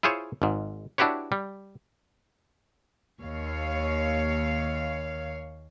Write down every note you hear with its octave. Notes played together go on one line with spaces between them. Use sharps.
E4 F4 G#4 C5 C#5
G#1 G#2
D4 E4 F#4 G4 B4 C#5
G3
D#2 C#5 F5